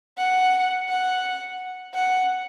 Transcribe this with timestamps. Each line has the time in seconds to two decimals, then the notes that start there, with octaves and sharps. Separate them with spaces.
0.17 F#5
0.88 F#5
1.94 F#5